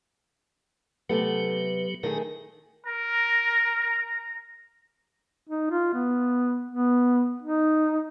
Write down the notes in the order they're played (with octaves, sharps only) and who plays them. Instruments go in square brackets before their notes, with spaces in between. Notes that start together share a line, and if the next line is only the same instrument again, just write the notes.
[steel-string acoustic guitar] C3 A3 B3 [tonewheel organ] F#3 G4
[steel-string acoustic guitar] D#3 A3 G#4 [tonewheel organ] D#4 A#4
[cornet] A#4 [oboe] A#5
[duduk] D#4
F4
B3
B3
D#4